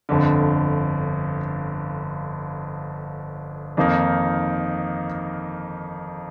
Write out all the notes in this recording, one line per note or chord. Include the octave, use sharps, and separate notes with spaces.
G1 F2 D3
F2 D#3 A#3 D#4